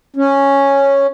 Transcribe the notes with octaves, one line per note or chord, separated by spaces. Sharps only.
C#4